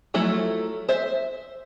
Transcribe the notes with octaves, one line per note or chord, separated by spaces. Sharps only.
F3 F#3 A3 E4
C5 E5